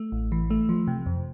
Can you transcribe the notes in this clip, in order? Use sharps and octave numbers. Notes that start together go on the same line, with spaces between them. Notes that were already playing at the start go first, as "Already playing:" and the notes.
Already playing: A3
A1
E3
A3
F3
C3
F2